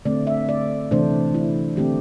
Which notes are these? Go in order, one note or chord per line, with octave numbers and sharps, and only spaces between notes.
D3 A3 C4 D5
E5
D5
C3 E3 A3 D4 C5
E4
D3 A3 C4 G4